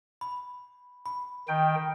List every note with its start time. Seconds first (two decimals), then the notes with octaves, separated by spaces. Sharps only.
0.21 B5
1.06 B5
1.48 D#3 G5